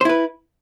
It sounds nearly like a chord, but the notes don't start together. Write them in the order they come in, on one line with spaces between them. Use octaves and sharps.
C5 E4 B4